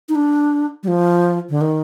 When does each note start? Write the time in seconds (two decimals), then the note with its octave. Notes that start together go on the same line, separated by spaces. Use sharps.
0.09 D#4
0.15 D4
0.83 G3
0.88 F3
1.50 D3
1.61 D#3